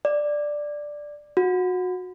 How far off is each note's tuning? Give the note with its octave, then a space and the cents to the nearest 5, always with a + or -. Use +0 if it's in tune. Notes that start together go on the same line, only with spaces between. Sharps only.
D5 +5
F#4 -25